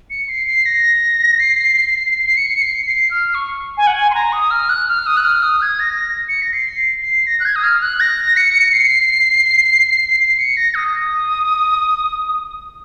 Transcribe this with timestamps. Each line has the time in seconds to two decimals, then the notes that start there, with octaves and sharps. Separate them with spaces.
0.10 C#7
0.29 C7
0.47 C7
0.66 A#6
1.39 C7
2.13 C7
2.26 C7
2.37 C#7
2.53 C#7
2.62 C7
2.86 C7
3.11 F6
3.35 C#6
3.77 G#5
3.87 F#5
3.96 G#5
4.10 C6
4.14 A#5
4.33 D#6
4.51 F6
4.69 F#6
4.88 F6
5.06 D#6
5.17 F#6
5.24 F6
5.43 D#6
5.61 G#6
5.80 A#6
6.29 C#7
6.42 A#6
6.53 C7
7.02 C7
7.27 A#6
7.40 F#6
7.45 G#6
7.56 D#6
7.64 F6
7.82 F#6
8.00 A#6
8.37 C#7
8.73 C7
10.20 C7
10.38 C#7
10.57 A#6
10.75 D#6